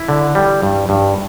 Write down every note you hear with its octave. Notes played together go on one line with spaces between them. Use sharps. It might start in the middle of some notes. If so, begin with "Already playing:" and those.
Already playing: E4
D3
G3
G2
G2